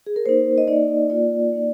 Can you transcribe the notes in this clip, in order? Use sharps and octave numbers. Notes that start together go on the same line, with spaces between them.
G#4
A#4
A#3 D#4 C5
D#5
A#3 D#4 D5
A#3 F4 D5
A#3 D#4